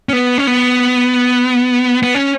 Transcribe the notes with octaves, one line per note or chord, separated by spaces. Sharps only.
C#4
B3
C#4
B3
B3
C#4